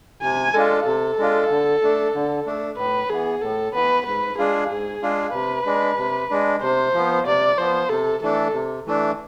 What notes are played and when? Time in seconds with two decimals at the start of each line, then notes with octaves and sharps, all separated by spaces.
0.23 C3 G#5
0.54 G#3 D4 F4 A4
0.86 C3 A4
1.18 G#3 D4 F4
1.50 D3
1.83 A3 D4
2.15 D3
2.47 A3 D4
2.78 A2 B4
3.10 E3 B3 G#4
3.42 A2 A4
3.74 E3 B3 B4
4.06 G#2 B4
4.38 G#3 D4 F4 G#4
4.70 G#2 G#4
5.02 G#3 D4 F4
5.34 C3 B4
5.66 G#3 D4
5.99 C3
6.30 G#3 D4
6.62 C3 C5
6.94 F3 B3
7.26 C3 D5
7.58 F3 B3 C5
7.90 C3 A4
8.22 E3 A3 D4 A4
8.54 C3
8.87 E3 A3 D4